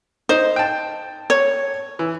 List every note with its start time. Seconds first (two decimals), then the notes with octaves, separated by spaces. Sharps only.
0.29 D#4 C5
0.56 G5 A5
1.30 C#5
1.99 E3